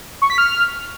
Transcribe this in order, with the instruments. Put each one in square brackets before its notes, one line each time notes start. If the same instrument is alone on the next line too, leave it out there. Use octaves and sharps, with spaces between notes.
[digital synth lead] C#6
B6
F6